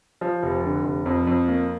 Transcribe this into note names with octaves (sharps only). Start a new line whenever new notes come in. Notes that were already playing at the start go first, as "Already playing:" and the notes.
F3
F1
D3
F1
F2
F2
A#3